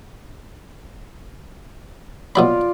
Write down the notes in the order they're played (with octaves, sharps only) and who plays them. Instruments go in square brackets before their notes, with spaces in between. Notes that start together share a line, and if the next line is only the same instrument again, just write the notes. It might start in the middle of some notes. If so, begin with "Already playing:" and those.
[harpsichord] B2 F#3 B5 [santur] F4 D5